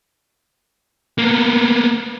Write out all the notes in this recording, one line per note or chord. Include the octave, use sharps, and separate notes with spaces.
A#3 B3